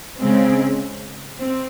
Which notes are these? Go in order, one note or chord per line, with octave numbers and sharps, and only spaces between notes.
C#3 G#3 C4
C4